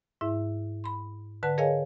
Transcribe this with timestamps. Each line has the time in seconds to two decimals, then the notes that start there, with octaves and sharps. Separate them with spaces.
0.21 G#2 E4 E5
0.84 B5 C6
1.43 D3 B4 F#5 A5
1.58 G#4 A#4 C#5 D#5 F5 G#5